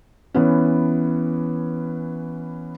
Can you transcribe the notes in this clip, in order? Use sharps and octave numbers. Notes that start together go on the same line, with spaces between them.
E3 B3 C#4